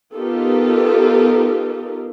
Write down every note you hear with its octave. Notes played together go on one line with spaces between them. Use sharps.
B3 D#4 F4 G4 A4 A#4